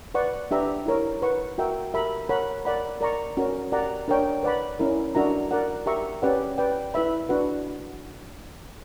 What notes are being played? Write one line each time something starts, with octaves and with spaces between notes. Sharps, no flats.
B4 D5 F#5 C#6
D4 G4 B4 E5 A#5
E4 A#4 C#5
B4 F#5 C#6
F#4 A#4 E5 G5
G4 A#4 E5 B5
A#4 C#5 F#5 B5
A#4 D5 F#5 B5
A#4 D5 A#5 C#6
C#4 F#4 A#4
G4 A#4 D5 F#5 A#5
D4 A#4 C#5 G5
B4 D5 F#5 B5
C#4 E4 A#4
D4 F#4 A#4 E5 A#5
A#4 D5 F#5
G4 A#4 E5 A#5 C#6
C#4 G4 B4 D5 F#5
B4 D5 G5
E4 B4 E5 B5
D4 F#4 B4 F#5